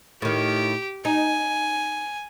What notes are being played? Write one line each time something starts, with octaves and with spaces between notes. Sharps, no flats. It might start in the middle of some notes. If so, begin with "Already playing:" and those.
A2 D#3 G4
D#4 G#5